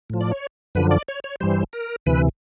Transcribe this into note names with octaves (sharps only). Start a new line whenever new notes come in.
A2 F3
D5
C#5
F#2 D3 F3 B4
D5
C#5
C#5
G2 E3 G3 C5
A#4
D2 C3 E3 B4